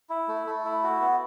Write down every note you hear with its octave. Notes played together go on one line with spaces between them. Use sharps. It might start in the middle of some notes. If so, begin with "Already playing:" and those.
E4
A3
A3
E4
F#4
B3